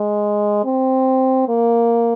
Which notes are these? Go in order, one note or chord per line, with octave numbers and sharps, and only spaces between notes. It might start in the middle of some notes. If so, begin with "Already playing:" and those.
Already playing: G#3
C4
A#3